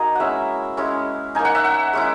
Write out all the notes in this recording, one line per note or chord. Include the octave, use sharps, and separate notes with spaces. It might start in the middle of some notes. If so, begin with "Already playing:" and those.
Already playing: A#3 D#4 F#4 G#4 D#5
G#3 C#4 E4 E5 F#5
G#3 C#4 E4
A#3 D#4 G#5
F#5
E5
F#5
G#3 C#4 E4